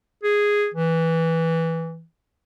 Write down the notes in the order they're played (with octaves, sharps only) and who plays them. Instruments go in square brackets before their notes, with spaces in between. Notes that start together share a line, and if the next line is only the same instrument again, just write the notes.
[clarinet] G#4
E3